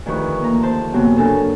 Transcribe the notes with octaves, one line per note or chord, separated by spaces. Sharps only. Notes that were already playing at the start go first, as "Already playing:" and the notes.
D2 D#3 F3 G4 B4 C#6
A#3 A#5
C5 A5 C6
F#2 C3 A#3 B3 C#4
C#3 D4 A4 A#4 G#5